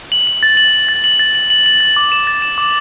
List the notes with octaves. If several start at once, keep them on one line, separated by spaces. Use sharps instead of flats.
F#7
F#7
A6
F#7
F#7
A6
F#7
A6
F#7
F#7
F#7
A6
D6
E7
A6
E7
D6